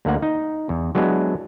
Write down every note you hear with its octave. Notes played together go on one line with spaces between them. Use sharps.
D2 A#3 F#5
D#4
E2
F#3 G#3 B3 D4 E4